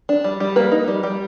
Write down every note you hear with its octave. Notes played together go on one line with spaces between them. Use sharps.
D4
G3
G3
A#3 B4
D#4
G3
G3